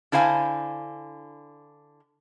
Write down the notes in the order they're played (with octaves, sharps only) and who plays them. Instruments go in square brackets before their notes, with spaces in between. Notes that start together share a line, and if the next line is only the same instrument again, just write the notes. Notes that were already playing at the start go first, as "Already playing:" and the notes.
[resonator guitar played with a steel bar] D3 E4 C5 F5 G#5